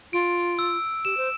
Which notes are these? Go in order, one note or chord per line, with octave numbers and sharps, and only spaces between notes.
F4 D7
E6
G4 E7
C5